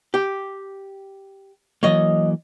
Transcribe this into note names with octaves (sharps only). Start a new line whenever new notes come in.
G4
E3 F#3 A#3 C#5 D#5